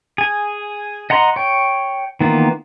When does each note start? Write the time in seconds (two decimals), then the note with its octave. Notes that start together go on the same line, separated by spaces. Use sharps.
0.18 G#4 G#5
1.10 D#5 F#5 A#5 C6
1.36 C#5 G5
2.20 D#3 E3 A#3 B3 F4